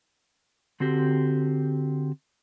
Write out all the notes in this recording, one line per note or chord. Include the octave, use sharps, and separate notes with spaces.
D3 C4 F#4 G4